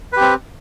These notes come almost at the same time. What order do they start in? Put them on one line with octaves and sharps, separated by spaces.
B4 G4 C4